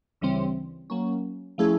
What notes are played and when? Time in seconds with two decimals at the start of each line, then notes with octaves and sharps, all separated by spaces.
0.21 D2 C#3 E3 G3 C4
0.90 F#3 A#3 C#4
1.58 F3 A3 C#4 E4 G#4